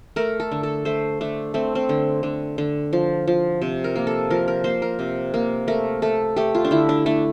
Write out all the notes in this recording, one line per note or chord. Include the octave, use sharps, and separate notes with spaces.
A3 A#4
A4
D3
A4
A3 C5
A3 D4
A3 C4
C4
D3
D3
D3
F3
F3
C3
A#4
A#3
A4
F3 A#4
A#4
A#3 C5
A#4
C3
A#3
A3 A#4
A3 A4
A3 G4
F4
D4
D3 E4
D4
A3 D4